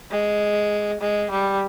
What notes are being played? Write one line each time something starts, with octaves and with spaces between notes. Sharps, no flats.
G#3
G#3
G3